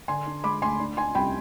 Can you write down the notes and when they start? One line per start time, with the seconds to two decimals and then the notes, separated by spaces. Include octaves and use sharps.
0.08 D3 G#5 C6
0.26 D4
0.44 G#3 B5 D6
0.62 D2 G#5 C6
0.80 D4
0.97 D4 G#5 C6
1.15 C2 G5 B5